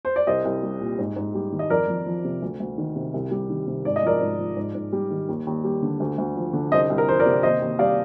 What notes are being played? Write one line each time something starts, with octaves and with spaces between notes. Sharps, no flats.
C5
D5
C2 C5 D#5
C2
G3
A#2
G#2
G#2
G3
D#3
D#5
F2 A#4 D5
F2
F3
C3
D2
D2
D#3
C3
C2
G3
D#3
C3
G#2 D5
D#5
F3 A#4 D5
G#2
F3
G#2
G#2
G3
D#3
D#2
D#2
G3
D3
D2
D2
F3
D3
C2 C5 D#5
C2
A#4
F3 C5
A#4 D5
C3
D#2 C5 D#5
D#2
G3 D5 F5